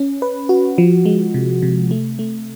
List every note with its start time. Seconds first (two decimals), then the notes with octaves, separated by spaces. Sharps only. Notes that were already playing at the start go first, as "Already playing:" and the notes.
Already playing: C#4
0.22 B4
0.49 F#4
0.78 F3
1.06 G#3
1.34 C3
1.62 C3
1.91 A3
2.19 A3